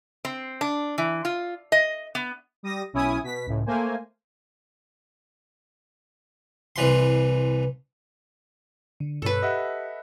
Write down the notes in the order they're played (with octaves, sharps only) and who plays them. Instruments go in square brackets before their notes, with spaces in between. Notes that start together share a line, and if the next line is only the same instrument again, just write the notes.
[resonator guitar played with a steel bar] C4
D4
E3
F4
D#5
B3
[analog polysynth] G3 D#6 A#6
B1 C#4 E4 G#5 D#6
B2 B6
C#2 A2
A3 A#3 C5 G#5
[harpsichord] C2 E3 C6
[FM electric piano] D3
[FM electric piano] G2 B2 C#5 [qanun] A4 B4
[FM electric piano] G4 [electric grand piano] D#5 E5 F#5